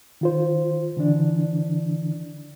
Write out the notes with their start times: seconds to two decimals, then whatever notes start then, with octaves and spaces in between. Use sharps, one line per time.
0.21 D#3 F4 C5
0.97 D3 E3 D4